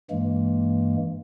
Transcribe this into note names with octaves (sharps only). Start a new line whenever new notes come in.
G2 E3 G#3 A#3